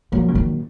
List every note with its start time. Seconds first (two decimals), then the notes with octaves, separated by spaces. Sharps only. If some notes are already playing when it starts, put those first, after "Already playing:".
0.12 A#2 F3 F#3 A#3
0.28 C#3
0.35 D#3